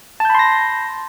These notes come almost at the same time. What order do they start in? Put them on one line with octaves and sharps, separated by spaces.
A5 G6 B5 C6 A#6